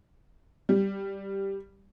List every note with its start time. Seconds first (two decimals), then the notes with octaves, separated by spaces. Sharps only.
0.69 G3